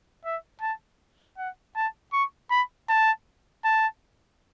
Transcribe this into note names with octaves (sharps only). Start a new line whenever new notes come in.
E5
A5
F#5
A5
C#6
B5
A5
A5